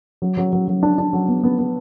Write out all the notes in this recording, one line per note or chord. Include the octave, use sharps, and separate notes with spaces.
F#3
F#3
F#3
F#3
D4
D4
F#3
B3
B3
B3